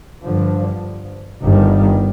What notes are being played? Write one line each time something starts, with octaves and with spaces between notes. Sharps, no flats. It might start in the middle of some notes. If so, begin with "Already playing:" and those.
G2 D3 F3
G1 G2 D#3 G3